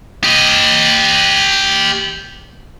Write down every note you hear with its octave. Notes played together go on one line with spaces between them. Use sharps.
G4 D#5